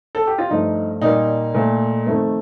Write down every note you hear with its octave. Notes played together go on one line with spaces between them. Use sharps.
A4
G4
F4
G2 F3 A3 D#4
A#2 G3 A#3 D#4
A#2 A3
F2 D#3 A3